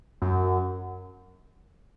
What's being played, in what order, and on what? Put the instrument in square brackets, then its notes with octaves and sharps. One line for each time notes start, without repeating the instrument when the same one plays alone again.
[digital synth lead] F#2